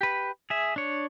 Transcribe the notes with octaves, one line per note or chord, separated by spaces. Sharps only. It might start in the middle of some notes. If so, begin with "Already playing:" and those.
G4 B4
G#4 E5
D4 C#5